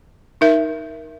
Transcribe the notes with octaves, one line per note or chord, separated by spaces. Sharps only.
D#4 A#4 E5